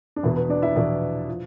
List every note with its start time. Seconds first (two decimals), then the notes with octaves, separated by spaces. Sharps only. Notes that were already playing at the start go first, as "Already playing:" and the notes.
0.16 D4
0.23 E2 B2 E4
0.36 B3 B4
0.49 D4 D5
0.62 E4 E5
0.76 E2 B2 D4 D5
1.28 F3